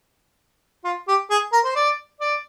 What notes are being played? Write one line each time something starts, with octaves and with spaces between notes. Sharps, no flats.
F4
G4
G#4
A#4
C5
D5
D5